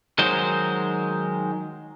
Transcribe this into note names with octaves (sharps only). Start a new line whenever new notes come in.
D#3 F#3 G#3 C5